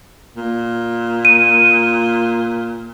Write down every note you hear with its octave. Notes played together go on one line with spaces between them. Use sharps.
A#2
D#7